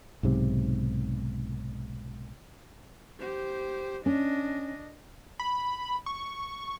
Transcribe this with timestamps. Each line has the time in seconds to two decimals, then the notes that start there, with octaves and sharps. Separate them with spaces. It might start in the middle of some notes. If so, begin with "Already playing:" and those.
0.23 B1 G#2 C3
3.20 G4 C5
4.06 C#4 D4 D#5
5.40 B5
6.06 C#6